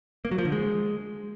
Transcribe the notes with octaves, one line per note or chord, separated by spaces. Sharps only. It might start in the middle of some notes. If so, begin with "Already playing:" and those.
A#3
F#3
F3
D3
G#3